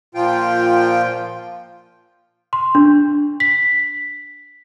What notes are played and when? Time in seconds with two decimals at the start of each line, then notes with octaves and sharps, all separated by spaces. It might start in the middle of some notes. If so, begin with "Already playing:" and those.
0.15 A#2 F3 F4 G5
2.53 C6
2.75 D4
3.40 B6